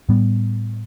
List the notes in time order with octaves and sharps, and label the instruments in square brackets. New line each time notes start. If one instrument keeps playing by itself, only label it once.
[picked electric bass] A2 G3 B3